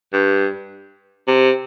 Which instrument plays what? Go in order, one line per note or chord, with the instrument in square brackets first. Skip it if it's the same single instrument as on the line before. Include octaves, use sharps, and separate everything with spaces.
[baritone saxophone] G2
C3